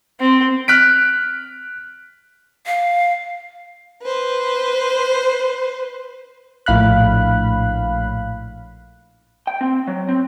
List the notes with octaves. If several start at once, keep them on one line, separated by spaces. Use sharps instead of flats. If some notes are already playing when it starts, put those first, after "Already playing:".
C4
F6 F#6 B6 D7
F5
B4 C5
A#1 A2 F5 B5 F#6
G5
C4
F#3
C4